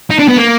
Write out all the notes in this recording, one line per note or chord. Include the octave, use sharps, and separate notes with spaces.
D#4
D4
B3
A#3